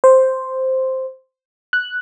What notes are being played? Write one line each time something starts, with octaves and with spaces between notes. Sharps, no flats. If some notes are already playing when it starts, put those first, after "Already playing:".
C5
F#6